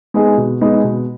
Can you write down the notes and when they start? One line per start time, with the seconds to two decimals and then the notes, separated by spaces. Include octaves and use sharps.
0.14 G#3 B3 D#4 G#4
0.37 B2
0.61 G#3 B3 D#4 G#4
0.84 B2